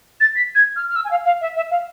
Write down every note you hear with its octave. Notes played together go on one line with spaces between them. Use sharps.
A6
B6
G#6
F6
F6
E6
G#5
F5
F5
E5
E5
F5